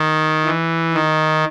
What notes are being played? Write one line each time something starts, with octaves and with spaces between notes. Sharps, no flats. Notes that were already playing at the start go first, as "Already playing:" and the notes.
Already playing: D#3
E3
D#3